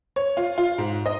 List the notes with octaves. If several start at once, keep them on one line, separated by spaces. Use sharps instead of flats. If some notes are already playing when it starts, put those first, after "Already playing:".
C#5
F4
F4
G#2
D#5